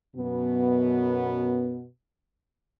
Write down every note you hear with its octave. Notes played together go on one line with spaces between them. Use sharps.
F#2 B2 B3